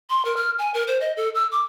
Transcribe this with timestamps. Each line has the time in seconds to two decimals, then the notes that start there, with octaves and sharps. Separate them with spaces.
0.10 C6
0.25 A#4
0.36 F6
0.59 G#5
0.74 A#4
0.87 C5
1.01 D#5
1.17 A4
1.35 E6
1.51 D6